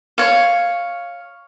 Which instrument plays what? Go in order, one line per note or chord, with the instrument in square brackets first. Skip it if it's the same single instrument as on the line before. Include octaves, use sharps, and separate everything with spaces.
[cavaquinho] C#5 F5